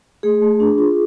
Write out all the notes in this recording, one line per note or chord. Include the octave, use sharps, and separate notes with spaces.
A3 G#4
A3
D4
F4